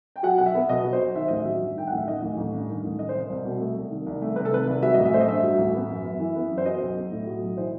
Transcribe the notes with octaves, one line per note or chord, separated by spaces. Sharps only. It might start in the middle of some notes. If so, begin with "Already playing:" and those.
G5
F#3 F#5
B1 F#5
E5
B3
B2 D#5
F#3
C5
B1
D#3 E5
A1 D#5
E5
F#3
G2
D#3 G5
F#5
A1
E5
D#3 D#5
A1
A1
G2
D#3
A1
A3 D#5
C5
C2
D#5
C2
B2
A3
C2
D#3
C2
A3
C3 B4
A4
D#3 B4
C2
F#3 E5
A1 D#5
E5
A3 C5
D#5
G2 E5
F#3
A1
B3
F#2
F#2
E3
B3
F#2
C5
F#3 D#5
B1
B1
A2
F#3
B1
E3 C5